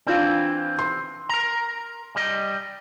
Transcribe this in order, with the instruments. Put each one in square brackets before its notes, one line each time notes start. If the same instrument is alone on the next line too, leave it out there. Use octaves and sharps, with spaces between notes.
[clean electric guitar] E3 C4 [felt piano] D4 F4 F5
[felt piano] C6
[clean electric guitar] A#4 A#5
G3 D#5